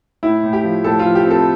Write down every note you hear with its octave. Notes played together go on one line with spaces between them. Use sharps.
A2 E4
A2
G4
F3
A2 A4
F4
F3
G4
C4 A4